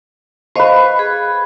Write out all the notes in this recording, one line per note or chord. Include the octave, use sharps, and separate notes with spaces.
B4 C5 D#5 F5 C#6
G#4